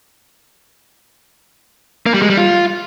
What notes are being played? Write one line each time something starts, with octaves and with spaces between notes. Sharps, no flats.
A#3
G3
G#3
G3
F4